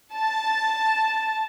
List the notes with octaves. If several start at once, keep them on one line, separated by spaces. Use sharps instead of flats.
A5